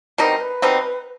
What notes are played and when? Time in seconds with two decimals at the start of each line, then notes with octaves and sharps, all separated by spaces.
0.18 B2 G3 C4 D#4 A#4
0.40 B4
0.62 B2 G3 C4 D#4